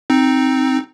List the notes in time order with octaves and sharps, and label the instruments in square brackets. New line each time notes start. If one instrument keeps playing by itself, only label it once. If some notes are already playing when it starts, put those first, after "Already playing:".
[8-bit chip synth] C4 D#4